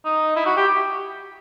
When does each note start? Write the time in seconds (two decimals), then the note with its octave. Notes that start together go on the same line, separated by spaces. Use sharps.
0.05 D#4
0.36 E4
0.46 F#4
0.57 G4